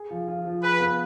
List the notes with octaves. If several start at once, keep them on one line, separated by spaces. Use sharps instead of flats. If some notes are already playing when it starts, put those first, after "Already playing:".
Already playing: G#4
F3
F4
F3
G#4 B4
B3